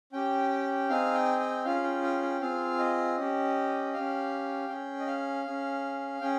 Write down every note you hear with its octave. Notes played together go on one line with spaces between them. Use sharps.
C#4 G4 G5
C4 D#4 G#4 F5
G5
G5
C#4 F4 G#4 F5
G5
G5
G5
C4 F4 G#4 F5
D#5
C#4 G4
C#4 G4 F5
C#4 G#4 G5
D#5
F5
C#4 G#4
C#4 G#4 G5